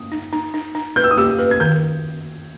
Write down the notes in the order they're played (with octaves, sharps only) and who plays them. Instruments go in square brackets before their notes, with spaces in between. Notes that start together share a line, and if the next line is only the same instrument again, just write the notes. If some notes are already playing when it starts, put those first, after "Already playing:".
Already playing: [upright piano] D#6
[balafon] D#4
D#4
D#4
D#4
[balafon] B4 [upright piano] G6
[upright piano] E6
D#6
[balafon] G4 [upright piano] E6
[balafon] B4
[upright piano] G#6
[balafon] D#3 [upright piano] G6